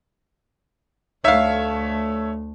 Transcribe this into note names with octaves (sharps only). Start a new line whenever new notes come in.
D2 A3 D#4 C#5 E5 F5